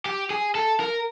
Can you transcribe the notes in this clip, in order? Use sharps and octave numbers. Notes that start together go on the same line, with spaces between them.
G4
G#4
A4
A#4